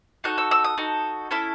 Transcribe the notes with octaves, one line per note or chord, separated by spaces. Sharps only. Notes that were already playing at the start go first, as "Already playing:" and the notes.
D#4 F#4 A4 F#6
E6
E6
D#6
D#4 F#4 A4
C#4 E4 A4 E6